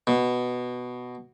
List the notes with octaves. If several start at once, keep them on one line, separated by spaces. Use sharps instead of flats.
B2